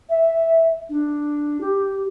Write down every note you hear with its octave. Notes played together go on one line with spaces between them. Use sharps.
E5
D4
G4